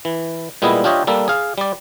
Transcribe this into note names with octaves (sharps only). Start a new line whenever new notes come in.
E3
A#2 G3 G#3 B3 E4 D#5
D4 F4 G4 C#5 D#5 E5
G3 A#3 A4
G#4 F5
G3 D5